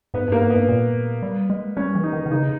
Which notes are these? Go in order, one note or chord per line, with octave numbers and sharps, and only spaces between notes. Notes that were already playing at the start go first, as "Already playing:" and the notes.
G#2 B3
G2 A#3
G#2
G2 B3
A#2
G3
G#3
G3 C#4
E3
D#4
D#3
D#3
C#3 D#4